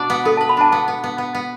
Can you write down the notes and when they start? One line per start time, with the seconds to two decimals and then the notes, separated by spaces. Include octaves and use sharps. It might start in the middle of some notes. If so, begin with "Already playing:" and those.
Already playing: B2 D4 D5
0.10 B3
0.25 B3 A4
0.37 B4 A5
0.49 B5
0.57 D4 A5
0.71 B3 A5
0.88 B3
1.04 B3
1.18 B3
1.35 B3